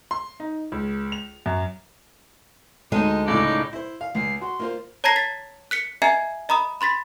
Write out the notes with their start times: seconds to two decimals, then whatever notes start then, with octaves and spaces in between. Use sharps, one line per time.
0.11 C6
0.40 D#4
0.72 C#2
1.12 F7
1.46 F#2
2.92 D2 G#3 D#4 D#5
3.28 C#2 A2 D#4 D5
3.73 E4 C5
4.01 F5
4.15 C#2 C7
4.41 F#4 C6
4.60 A#3 F4 C5
5.04 C#5 A5 A#5 G#6 A#6 C7
5.16 A6 B6
5.71 F#6 B6 C#7
6.02 D#5 E5 G#5 A#5 G#6 C7
6.49 D#5 A#5 B5 D#6
6.81 B5 C6 A6 B6